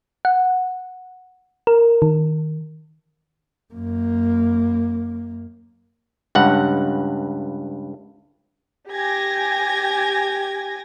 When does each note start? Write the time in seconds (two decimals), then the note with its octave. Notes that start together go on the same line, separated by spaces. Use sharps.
0.25 F#5
1.67 A#4
2.02 D#3
3.74 F#2 A#3
6.35 C#2 G2 F#5
8.91 G4 G#5 G#6 A#6